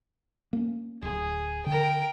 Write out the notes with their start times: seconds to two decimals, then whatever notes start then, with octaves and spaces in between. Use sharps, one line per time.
0.53 A#3 C#4
1.02 D1 G#4
1.66 D3 A#4 G5